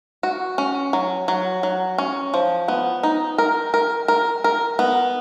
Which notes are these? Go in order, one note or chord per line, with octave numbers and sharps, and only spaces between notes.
F#4
C#4
F#3
F#3
F#3
C#4
F3
B3
D#4
A#4
A#4
A#4
A#4
B3